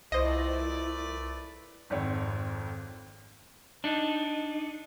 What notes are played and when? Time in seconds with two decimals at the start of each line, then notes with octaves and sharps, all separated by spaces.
0.12 C2 A3 E4 F4 B4 C5 D5 D#5
1.90 G#1 F2 C4 C#5
3.84 D4 D#4